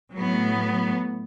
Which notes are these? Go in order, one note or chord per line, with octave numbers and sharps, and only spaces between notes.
A2 F#3 B3